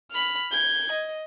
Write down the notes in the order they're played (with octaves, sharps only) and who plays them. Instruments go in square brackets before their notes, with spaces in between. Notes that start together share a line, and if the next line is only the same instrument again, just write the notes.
[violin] B5 F6
G6 G#6
D#5